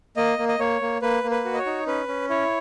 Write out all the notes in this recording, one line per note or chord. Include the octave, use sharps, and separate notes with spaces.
A#3 D#5
A#3
D#5
A#3 C#5
A#3
A#3 B4
A#3
B4
F#4
D#5
C#5
D#4
C#4 B4
C#4
E4 C#5